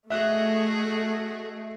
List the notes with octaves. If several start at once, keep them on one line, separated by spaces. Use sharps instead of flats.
A3 F#4 G#4 D#5 E5 F#6